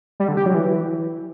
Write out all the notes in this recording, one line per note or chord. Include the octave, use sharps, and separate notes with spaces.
G3
D3
G4
F#3
E3